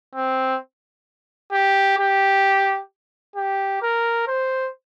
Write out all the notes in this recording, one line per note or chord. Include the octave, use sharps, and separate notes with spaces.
C4
G4
G4
G4
A#4
C5